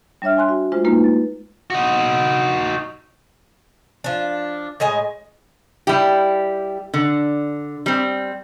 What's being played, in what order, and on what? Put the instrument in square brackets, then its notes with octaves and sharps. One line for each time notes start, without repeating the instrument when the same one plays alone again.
[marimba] G3 D4 C#5 E5 F6
G#5 C6 F#6
F#4
G#3 A3 F4 C5
G#3 A#3 D#4 F4 B4
A6
[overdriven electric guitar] D#4 F#4
[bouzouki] F3 D4
A2 G#3 D#5 G#5
[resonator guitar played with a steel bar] G3 E4 G4
D3
G3 C4